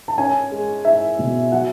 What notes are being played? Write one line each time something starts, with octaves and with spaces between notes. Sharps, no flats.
A5
C#4 G#5
G#3
E4 E5
B2
F#3 F#5